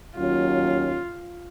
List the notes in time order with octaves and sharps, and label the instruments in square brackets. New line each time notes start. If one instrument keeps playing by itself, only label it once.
[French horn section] D#2 F#3 C#4 [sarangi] F4